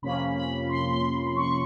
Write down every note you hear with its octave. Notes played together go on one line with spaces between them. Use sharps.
F2 C3 F3 A#3 C#4 B5
B5
C6
C6
C#6